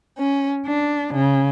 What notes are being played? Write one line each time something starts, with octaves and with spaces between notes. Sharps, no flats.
C#4
D4
C#3